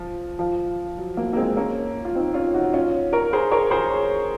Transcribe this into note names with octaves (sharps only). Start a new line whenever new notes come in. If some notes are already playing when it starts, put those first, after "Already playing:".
Already playing: F3
F3
F#3
F#3 A#3
A#3
G#3 C4
A#3 C#4
F4
C4 D#4
C#4 F4
D#4 F#4
C#4 F4
A#4 C#5
G#4 C5
A#4 C#5
G#4 C5